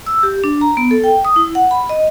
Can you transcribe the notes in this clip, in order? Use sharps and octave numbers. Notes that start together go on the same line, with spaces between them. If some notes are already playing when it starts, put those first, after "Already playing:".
E6
G4
D4
A#5
B3
A4
G5
D#6
E4
F#5
B5
D#5